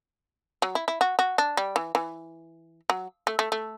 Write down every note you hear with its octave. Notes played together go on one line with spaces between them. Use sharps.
F#3
E4
E4
F#4
F#4
D4
G3
E3
E3
F#3
A3
A3
A3